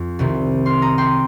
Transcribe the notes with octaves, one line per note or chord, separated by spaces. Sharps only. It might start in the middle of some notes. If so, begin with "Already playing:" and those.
Already playing: F2
C2 C3 D#3
C6 F6
A#5 D#6
G5 C6